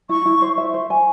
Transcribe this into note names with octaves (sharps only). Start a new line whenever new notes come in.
E4 C#6
E4
C5
E5
C5
G#5